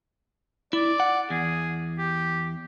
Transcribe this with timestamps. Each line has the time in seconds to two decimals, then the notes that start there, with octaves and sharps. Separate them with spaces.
0.73 E4 D5
1.00 F#5
1.30 E2 G#4
1.98 G4